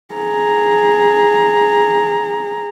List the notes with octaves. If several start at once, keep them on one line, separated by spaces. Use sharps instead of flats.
G#4 A#5